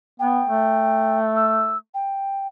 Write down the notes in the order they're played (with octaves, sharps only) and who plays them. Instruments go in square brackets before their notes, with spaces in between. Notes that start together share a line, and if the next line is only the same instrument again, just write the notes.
[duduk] B3 [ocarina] G5
[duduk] A3
[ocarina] E6
G5